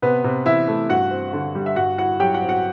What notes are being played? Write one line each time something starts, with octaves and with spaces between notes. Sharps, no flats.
C3 B3 B4
C3
E3 E4 E5
A3
G2 F#4 F#5
C4
D3
G3
E5
G2 F#4 F#5
E4 F#4 F#5
F#3 G4 G5
F#4 F#5
C4
F#4 F#5